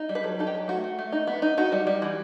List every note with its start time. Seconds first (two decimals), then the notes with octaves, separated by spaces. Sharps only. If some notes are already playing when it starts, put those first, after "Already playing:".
Already playing: D#4
0.09 G3
0.15 B4
0.24 F#3 A4
0.39 D#4 A4
0.47 G4
0.54 F#3
0.68 A3 F#4
0.84 A3
0.99 A3
1.12 D#4
1.27 B3
1.42 D#4
1.58 D#4 F#4
1.72 G3
1.87 G3
2.02 E3